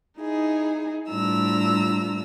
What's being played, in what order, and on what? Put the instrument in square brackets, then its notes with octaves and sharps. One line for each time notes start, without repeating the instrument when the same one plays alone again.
[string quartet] D#4 E4 G#4
A2 G3 D4 F4 A#5 E6